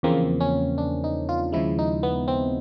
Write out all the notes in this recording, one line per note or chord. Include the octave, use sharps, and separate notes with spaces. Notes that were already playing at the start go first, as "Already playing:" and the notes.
E2 C#3 F3 A#3 C4
C#4
D4
D#4
F4
D#2 C#3 F3 G#3 E4
D#4
B3
C4